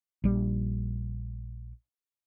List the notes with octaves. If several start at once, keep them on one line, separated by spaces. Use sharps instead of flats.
A#1 G3